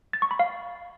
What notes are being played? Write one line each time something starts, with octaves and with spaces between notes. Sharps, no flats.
A6
C#6
B5
F5